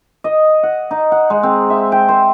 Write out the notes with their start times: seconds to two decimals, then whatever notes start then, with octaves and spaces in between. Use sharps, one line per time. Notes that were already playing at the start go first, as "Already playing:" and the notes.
0.24 D#5
0.63 F#5
0.91 D#4
1.12 F#5
1.30 G#3
1.43 C4
1.70 E5
1.92 G5
2.08 C5